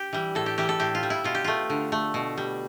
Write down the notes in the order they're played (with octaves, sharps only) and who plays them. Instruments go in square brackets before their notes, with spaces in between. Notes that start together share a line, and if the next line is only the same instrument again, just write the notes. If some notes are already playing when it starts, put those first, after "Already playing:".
Already playing: [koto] G4
E3 G3
A2 A4
G4
E3 G3 G4
A4
A2 G4
F4
G3
E4
B2 F4
G4
A3 F4
D3
A3
B2
G3